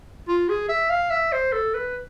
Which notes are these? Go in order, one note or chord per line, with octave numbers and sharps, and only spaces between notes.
F4
G#4
E5
F5
E5
C5
A4
B4